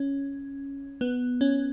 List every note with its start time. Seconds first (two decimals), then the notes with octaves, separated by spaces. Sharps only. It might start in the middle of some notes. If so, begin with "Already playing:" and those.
Already playing: C#4
1.01 B3
1.41 C#4